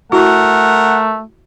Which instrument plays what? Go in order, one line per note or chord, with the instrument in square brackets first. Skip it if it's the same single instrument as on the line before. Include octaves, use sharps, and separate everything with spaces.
[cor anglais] A3 [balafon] E4 F#4 [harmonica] A#4 [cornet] F#5